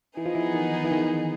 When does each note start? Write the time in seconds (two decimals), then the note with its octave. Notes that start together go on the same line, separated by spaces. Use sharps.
0.17 E3 B3 D#4 G#4
0.26 F3
0.35 E3
0.54 D#3
0.84 E3
0.91 D#3